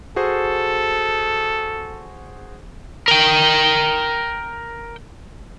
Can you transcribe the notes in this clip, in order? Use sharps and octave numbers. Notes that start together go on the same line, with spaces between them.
F#4 G#4 A4 C5
A#4 G5